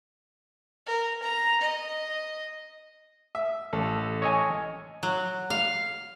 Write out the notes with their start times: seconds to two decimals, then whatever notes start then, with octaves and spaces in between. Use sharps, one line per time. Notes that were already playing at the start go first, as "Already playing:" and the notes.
0.86 A#4
1.23 A#5
1.61 D#5
3.35 E5
3.73 A1 A4
4.22 C#5 D#5 G#5
5.03 F#3
5.50 F5